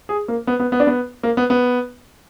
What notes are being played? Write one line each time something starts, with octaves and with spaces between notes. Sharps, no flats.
G#4
A#3
B3
B3
B3
D4
B3
A#3
B3
B3